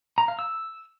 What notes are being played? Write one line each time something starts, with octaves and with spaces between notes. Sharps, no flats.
A#5
F5
E6